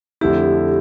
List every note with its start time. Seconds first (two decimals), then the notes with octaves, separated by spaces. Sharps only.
0.21 F2 D3 A3 E4 G4